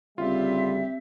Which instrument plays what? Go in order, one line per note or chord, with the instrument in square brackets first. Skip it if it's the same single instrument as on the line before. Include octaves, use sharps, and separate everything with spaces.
[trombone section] D2 C#3 G3 [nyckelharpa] C4 G4 [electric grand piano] F4 [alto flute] E5